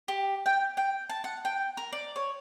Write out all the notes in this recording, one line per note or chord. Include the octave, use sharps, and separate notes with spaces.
G4
G5
G5
A5
F#5
G5
A#4
D5
C#5